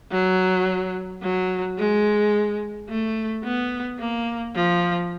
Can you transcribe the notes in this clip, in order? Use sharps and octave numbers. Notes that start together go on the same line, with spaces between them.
F#3
F#3
G#3
A3
B3
A#3
F3